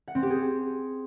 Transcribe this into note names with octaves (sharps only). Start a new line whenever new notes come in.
F#5
C4
G4
G#4